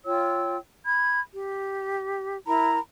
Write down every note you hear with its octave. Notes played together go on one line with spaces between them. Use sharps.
F4 C#5 G5 E6
B5 G#6
G4
E4 A#4 A#5 B5